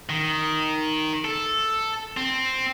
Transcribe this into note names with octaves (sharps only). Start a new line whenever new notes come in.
D#3
A4
C4